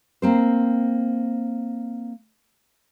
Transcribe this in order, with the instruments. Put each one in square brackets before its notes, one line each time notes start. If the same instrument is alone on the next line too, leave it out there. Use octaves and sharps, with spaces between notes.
[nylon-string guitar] A#3 C4 C5